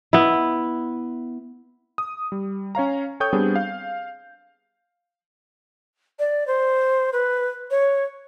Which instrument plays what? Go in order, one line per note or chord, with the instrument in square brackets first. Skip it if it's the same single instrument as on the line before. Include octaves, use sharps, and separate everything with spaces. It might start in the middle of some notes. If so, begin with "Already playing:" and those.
[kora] B3 E4
[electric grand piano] D#6
G3
C#4 C#5 F5 A#5
A4 C#5 G5 C#6 D#6 G6
G3 B3 C4 D4 G#4
F5
[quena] D5
C5
B4
C#5